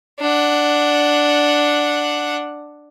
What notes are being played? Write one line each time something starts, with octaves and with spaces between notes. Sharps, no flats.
D4 F#5